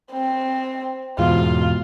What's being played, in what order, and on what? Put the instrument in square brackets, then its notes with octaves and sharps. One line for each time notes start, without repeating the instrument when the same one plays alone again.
[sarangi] C4
[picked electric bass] E2 G#2 B2 [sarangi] F4